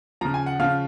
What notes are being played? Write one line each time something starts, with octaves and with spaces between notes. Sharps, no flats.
C#3 F3 A#5
G#5
F#5
C#3 F3 F5